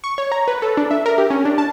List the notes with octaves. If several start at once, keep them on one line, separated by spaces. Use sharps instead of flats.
C#6
C#5
A#5
B4
A4
D4
E5
A#4
G4
C#4
D4
A5